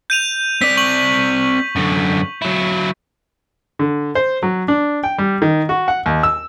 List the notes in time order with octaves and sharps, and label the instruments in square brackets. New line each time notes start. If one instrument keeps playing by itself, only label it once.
[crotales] G6 D#7 F7
[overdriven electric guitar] C4 D5 [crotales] B6
[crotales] C#6 F#7
[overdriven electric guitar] F#2 D3
F#3 E4
[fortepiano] D3
C5
F#3
D4
G5
G3
D#3
F#4
F#5
D#2
E6